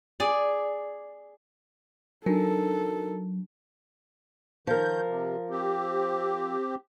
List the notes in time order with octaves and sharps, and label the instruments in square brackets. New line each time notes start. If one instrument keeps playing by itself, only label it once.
[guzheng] G#4 D5
[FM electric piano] F#3 [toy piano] D4 [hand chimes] D#4 A#4 [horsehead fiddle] A4
[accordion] D#3 G6 [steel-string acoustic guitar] F3 A#4
[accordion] C3
C4 G4